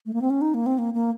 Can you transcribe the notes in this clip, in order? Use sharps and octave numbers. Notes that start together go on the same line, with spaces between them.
A3
A#3
C4
C#4
D#4
A#3
C4
A#3
A#3